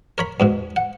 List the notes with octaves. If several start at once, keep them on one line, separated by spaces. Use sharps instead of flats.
A#4 C#5 B5
E2 G#2 B2
F#5